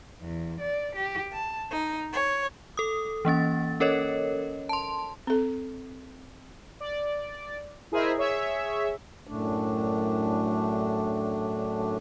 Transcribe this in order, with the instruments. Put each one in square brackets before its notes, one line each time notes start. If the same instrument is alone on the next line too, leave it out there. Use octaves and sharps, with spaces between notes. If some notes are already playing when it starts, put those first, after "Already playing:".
[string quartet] E2
D5
G4
A5
D#4
C#5
[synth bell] A4 D#6
E3 A#3 C#4 A6
C#4 A4 A#4 C#5 D#5
A5 C6
[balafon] C4 A4
[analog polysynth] D5
E4 G#4 A#4 C5 D#5 E5
G#4 C#5 E5
[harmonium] F#2 A2 A3 D4